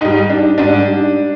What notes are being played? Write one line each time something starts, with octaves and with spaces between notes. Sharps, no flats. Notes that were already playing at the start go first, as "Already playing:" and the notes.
G#2 G3 D#4
D4
G#2 G3 D4